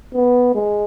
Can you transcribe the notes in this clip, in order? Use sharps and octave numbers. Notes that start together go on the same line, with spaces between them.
B3
G#3